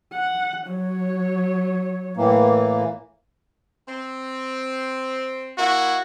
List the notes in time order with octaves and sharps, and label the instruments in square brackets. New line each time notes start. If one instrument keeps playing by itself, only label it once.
[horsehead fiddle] F#5
F#3 C#5
[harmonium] A2 E3 A#3
[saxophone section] C4
[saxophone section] A#3 E4 [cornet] F#4